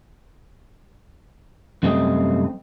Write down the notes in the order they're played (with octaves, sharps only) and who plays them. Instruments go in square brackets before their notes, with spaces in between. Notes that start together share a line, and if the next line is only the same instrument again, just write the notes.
[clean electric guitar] F#2 C3 G3 A3 C4 D#5